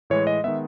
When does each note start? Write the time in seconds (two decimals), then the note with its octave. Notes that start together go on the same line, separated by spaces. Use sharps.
0.10 A2 E3 G#3 C#5
0.27 D#5
0.44 D#3 G#3 B3 E5